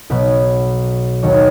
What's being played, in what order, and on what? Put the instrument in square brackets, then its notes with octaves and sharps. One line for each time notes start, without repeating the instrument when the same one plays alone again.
[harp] B1 B2 F#3 B4
D#2 D#3 F#3 C#5